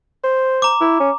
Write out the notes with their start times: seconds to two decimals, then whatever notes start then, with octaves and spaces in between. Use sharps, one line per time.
0.24 C5
0.62 A#5 D6
0.81 E4
1.00 C#4